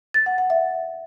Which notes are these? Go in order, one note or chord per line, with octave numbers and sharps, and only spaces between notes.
A6
F#5
F#5
E5